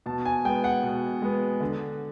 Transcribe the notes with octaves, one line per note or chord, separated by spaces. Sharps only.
B2 A5
G#5
G#3 B3 G5
F#5
B2
G#3 B3
D3